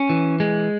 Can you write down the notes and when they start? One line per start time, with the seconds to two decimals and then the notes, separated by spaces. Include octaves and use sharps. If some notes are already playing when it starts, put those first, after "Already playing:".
Already playing: C#4
0.09 E3
0.40 G#3